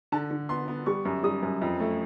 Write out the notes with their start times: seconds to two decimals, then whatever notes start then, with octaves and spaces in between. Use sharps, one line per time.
0.12 D3 A5
0.31 D3
0.49 B3 C6
0.68 B3
0.86 G3 C#6
1.05 F#2
1.24 G3 D#6
1.43 F#2
1.61 F2
1.80 A3